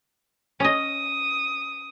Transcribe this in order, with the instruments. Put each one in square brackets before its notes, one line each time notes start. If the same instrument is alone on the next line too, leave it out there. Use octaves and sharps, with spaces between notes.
[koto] C#4 D#5 [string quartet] D#6